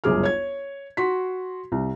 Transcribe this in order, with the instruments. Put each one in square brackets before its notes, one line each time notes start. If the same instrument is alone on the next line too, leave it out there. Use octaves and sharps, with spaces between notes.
[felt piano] G1 C#2 F#2 G#4 D6 F6
C#5 G#6
F#4 C6 B6
C2